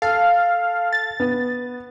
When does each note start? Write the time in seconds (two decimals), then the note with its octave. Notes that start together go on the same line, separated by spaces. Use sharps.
0.02 A4 F5
0.93 A6
1.20 B3